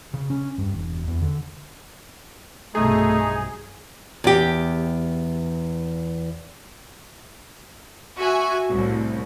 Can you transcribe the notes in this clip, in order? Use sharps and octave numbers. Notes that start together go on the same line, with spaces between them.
C#3
C#4
G2
E1
E2
D3
B1 G2 C3 A3 D#4 G#4
E2 G4
F#4 E5 G#5
C2 A2